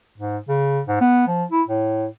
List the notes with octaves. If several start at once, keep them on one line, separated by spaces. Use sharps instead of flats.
G#2
C#3
G#2
B3
F3
E4
A2